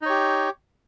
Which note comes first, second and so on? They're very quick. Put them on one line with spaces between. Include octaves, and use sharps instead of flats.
D#4 C#5 G4